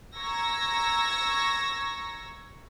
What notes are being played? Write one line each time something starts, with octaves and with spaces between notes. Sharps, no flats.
A#5 C#6 E6 G#6 A#6